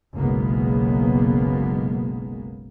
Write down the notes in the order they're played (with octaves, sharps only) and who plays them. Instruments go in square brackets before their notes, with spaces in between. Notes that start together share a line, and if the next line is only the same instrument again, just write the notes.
[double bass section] F#1 B1 G#3 A#3 B3